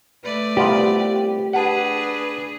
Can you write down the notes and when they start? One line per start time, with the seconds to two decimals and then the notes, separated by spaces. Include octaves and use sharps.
0.23 A3 B4 D5
0.57 C2 B3 F4 G4
1.53 D4 G#4 B4 F#5 A5